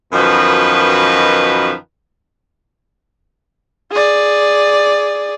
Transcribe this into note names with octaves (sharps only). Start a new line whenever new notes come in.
F#2 B2 D#3 F3 B4 D#5
G#4 D5